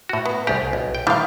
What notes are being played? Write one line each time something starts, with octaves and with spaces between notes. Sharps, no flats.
A2 F#4
B3
C2 G4 G#4
B1
G5
A2 D#3 G3 E4 F5